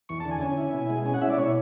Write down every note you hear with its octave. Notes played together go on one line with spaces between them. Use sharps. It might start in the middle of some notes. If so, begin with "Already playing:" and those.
E2 C#6
A5
D3
G#5
C#4 G#5
E4
B2
G#3
C#4 G#5
F#5
E4 E5
D5
B2 C#5